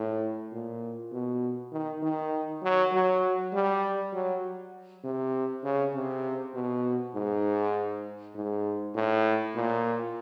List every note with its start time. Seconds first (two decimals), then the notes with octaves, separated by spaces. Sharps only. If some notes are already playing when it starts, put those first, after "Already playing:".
Already playing: A2
0.52 A#2
1.12 B2
1.72 D#3
2.03 D#3
2.63 F#3
2.93 F#3
3.53 G3
4.13 F#3
5.04 C3
5.64 C#3
5.94 C3
6.54 B2
7.15 G#2
8.35 G#2
8.95 A2
9.55 A#2